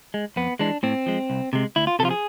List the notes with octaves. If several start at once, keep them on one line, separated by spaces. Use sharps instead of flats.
G#3
F2 B3
E3 G#3 D4
A2 C4
F3 G#3
C2
C3 G#3
D2 E4
F4
C3 F3 F4 A4
G#4